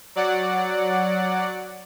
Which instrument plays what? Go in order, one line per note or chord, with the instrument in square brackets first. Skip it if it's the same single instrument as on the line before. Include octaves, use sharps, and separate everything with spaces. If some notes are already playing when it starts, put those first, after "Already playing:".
[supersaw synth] F#3 D5 F#5